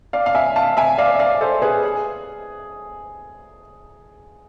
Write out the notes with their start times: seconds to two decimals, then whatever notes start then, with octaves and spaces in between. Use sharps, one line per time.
0.13 D5 F5
0.26 F5
0.35 E5 G#5
0.56 F5 A5
0.77 E5 G#5
0.98 D5 F5
1.15 E5
1.19 D5 F5
1.41 A4 C5
1.62 G#4 B4
1.84 G#4